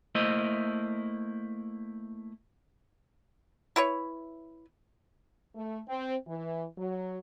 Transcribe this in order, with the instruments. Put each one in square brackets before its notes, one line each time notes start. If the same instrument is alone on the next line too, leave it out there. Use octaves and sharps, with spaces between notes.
[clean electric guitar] A3 A#3 E4 C5 D#5
[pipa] E4 B4 C#5
[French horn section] A3
C4
E3
F#3